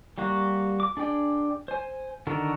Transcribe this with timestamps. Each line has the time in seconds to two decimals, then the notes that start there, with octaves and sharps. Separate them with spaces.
0.18 G3 A#3 F#4
0.80 D6
0.97 D4 G#4 D5 G5
1.68 C5 G#5
2.27 D3 D#3 F#4 A4 A#4